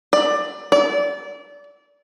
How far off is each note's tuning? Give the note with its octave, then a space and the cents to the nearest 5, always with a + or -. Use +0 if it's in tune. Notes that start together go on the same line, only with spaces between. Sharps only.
D5 +15
D5 -25